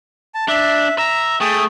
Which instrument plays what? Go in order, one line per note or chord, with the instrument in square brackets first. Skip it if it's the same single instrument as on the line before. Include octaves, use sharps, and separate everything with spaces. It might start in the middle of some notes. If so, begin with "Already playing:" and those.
[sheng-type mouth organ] A5
[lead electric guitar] D4 [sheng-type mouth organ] E5
[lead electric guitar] E5 [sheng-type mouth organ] A#5
[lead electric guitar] A3 [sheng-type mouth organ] G#4 G5 D#6